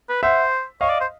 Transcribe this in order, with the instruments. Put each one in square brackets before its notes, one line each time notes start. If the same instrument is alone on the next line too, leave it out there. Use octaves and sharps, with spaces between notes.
[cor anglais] B4
[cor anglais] C5 [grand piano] E5 F#5
[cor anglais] C#5 [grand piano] D#5 F5
[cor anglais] D5
C5